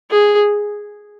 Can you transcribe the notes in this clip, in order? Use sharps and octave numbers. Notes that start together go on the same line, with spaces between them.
G#4